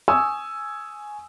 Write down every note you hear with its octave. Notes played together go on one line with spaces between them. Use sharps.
G#5 C#6 D#6 E6